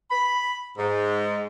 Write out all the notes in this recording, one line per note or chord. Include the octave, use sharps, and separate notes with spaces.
B5
G#2